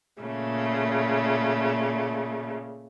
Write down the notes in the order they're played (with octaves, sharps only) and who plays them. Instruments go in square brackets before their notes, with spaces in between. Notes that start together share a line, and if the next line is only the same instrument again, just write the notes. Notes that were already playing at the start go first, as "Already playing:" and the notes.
[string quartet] A#2 C#3 A3